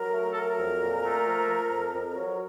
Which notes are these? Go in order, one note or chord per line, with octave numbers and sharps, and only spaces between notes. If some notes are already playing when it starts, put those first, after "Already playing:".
Already playing: F#3 A#4
A3
A4
F#3 A#4
F2
A#2
A3
F3
F3
F2
F2
F#3